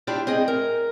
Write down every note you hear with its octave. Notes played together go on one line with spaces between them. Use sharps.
D4 E4 F4 G4 D5
C4 G#4 D#5
A#4